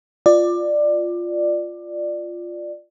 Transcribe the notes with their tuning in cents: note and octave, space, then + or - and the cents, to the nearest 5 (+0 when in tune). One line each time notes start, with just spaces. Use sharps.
F4 +0 D5 +15